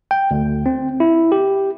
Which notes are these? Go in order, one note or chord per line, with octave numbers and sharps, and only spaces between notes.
G5
D2
C4
E4
G4